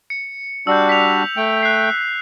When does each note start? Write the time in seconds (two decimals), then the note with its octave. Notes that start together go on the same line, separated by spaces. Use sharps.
0.10 C#7
0.67 G3 D4 F#4 E6 G6
0.89 B6 F7
1.37 A3 G5
1.63 F#6 C7